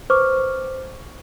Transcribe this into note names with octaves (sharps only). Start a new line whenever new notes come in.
B4 C5 C#6 D6 F6